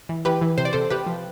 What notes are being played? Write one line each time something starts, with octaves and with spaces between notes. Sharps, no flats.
E3
E3 G4 B4
E3
C3 C5
D5
C3 A4 C5
C3 G4 B4
F3